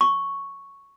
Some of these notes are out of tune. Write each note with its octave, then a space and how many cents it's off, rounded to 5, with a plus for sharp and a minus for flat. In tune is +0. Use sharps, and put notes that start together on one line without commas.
C#6 +0